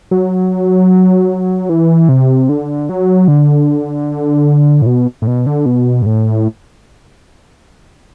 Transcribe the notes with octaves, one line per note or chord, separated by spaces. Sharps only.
F#3
E3
C3
D3
F#3
D3
A2
B2
A2
B2
D3
B2
G2
A2